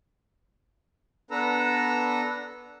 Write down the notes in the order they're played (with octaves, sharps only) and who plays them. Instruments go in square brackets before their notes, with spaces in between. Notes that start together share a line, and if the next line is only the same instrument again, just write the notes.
[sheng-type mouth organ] B3 D4 A4 B4 A#5 E6